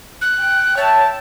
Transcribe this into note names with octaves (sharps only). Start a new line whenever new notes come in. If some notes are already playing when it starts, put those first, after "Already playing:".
F#6
G5
C#5 E5 G5 A5